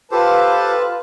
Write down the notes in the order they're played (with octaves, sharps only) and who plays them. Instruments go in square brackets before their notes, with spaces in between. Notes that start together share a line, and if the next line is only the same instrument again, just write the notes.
[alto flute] F4 [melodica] G4 A4 C5 [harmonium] B4 A5